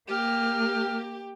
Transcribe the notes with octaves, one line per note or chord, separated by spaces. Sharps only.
A#3 G4 F6